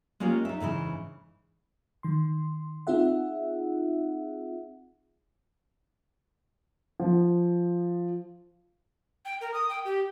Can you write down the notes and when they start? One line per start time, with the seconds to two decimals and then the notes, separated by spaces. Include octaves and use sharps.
0.20 G#3 A#3 C#4 F4 G4 A#4
0.45 D#4 E5
0.60 G#2 C#3 E3 E4
2.03 D#3 C6
2.87 C4 D#4 F4 G#4 E5 F#5
7.00 F3
9.25 G5
9.41 A#4
9.54 D#6
9.69 G5
9.85 G4